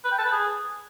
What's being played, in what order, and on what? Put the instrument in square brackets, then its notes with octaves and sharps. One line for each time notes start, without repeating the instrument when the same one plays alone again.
[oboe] B4
G5
A5
B4
G#4